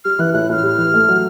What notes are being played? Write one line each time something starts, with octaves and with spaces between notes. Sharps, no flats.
G3 F6
E3 F#6
A2 F#6
A2 F6 F#6
G3
E3
A3
F#3